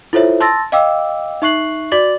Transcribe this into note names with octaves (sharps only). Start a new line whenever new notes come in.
E4 F4 A4 C5 C#5 E5
A5 C6 E6 A6 A#6
D#5 F5 G5 D6 E6
D#4 E5 C#6 F#6 C7 F#7
F#4 D5 D6 A6 F#7